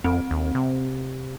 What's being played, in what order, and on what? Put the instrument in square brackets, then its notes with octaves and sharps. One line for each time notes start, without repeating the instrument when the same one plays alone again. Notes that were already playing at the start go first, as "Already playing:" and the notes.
[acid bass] F2 [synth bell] C4
[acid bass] D#2
C3